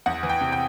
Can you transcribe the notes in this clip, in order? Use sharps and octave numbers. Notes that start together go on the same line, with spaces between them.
E2 F#5
E3
G5
C3
G5